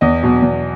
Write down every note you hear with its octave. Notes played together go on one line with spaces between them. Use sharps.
E2 D#5
B2 F#3
E2